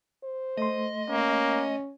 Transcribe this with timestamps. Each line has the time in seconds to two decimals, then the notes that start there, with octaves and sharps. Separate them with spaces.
0.23 C5
0.57 A3 D#5 C6
1.09 A#3 C#4